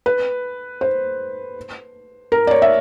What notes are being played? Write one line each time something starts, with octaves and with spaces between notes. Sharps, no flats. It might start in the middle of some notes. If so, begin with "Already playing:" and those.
B4
C5
A#4
D5
C#5
E5